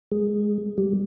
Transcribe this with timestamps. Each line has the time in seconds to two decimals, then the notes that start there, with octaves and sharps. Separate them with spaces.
0.12 G#3
0.78 G3